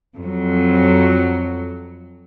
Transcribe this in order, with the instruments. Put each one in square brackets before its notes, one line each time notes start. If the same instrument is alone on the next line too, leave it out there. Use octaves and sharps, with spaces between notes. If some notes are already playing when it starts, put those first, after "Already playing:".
[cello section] F2 F#3